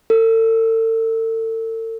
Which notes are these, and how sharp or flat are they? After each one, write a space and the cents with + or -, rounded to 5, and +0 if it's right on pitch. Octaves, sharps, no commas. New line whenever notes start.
A4 +40